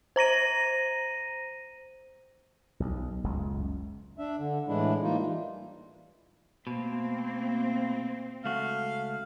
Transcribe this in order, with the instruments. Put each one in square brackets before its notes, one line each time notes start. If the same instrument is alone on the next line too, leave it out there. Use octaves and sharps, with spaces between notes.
[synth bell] C5 A#5 A#6 D#7
[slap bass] B1
F#1 C#2
[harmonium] D4 E5
D3
A2 E3 G#3 D4 E4
E3 G3 A#3 D#4 F4
[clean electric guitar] B2 [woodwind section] A3 A#3 [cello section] C4
[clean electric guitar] C#2 A3 F#4 [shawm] F5